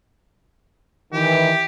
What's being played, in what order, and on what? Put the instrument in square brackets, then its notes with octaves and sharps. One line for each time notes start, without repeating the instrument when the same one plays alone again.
[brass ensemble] D#3 E3 [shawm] G4